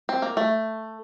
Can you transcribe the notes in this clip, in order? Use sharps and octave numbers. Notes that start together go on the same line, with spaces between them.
C4
A#3
A3